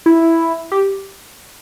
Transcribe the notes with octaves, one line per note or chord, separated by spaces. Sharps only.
E4
G4